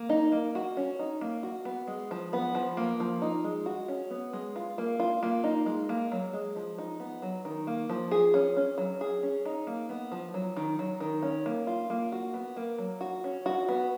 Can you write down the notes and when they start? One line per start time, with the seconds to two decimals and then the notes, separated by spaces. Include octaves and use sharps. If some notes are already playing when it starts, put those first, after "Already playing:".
Already playing: A#3
0.09 D#4
0.32 A#3
0.55 F#4
0.77 C#4
0.99 D#4
1.21 A#3
1.43 F#4
1.65 B3
1.88 G#3
2.11 F3
2.33 B3
2.55 F3
2.77 A#3
3.00 F3
3.22 D#4
3.44 G#3
3.66 F#4
3.88 C#4
4.11 B3
4.33 G#3
4.56 F4
4.78 A#3
5.00 F4
5.23 A#3
5.44 D#4
5.66 G#3
5.89 A#3
6.12 F#3
6.33 G#3
6.56 F3
6.78 D#4
7.00 B3
7.22 F#3
7.45 D#3
7.67 A#3
7.90 F3
8.11 G#4
8.34 C#4
8.57 C#4
8.78 F#3
9.01 G#4
9.23 C#4
9.45 D#4
9.67 A#3
9.89 B3
10.12 F3
10.34 F#3
10.57 D#3
10.79 F#3
11.00 D#3
11.23 C#4
11.46 A#3
11.67 F4
11.90 A#3
12.12 F#4
12.34 B3
12.57 A#3
12.78 F#3
13.01 F#4
13.24 C#4
13.46 F#4
13.69 B3